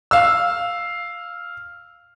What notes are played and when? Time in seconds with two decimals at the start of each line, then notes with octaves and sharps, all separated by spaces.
0.11 F5 E6